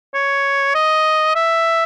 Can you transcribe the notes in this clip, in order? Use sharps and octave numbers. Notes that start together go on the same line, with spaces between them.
C#5
D#5
E5